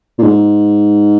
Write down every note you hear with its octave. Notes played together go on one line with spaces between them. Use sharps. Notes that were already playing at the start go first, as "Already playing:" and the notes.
A#2
G#2